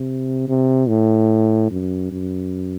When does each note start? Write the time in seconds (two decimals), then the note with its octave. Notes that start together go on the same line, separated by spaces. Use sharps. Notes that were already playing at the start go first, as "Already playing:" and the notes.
Already playing: C3
0.48 C3
0.89 A2
1.71 F#2
2.12 F#2